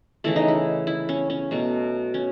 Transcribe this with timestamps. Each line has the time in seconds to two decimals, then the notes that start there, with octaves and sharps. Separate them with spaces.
0.24 C#3 E3 A3 E4
0.36 D#4
0.48 E4
0.87 E4
1.09 C#4
1.30 C#4
1.51 B2 F#3 A3
2.14 C#4